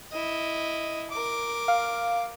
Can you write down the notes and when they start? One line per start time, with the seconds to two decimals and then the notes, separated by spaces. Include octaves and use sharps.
0.12 E4 D#5
1.11 A#4 D6
1.68 F5